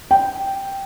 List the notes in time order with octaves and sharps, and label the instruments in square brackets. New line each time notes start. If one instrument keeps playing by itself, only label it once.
[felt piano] G5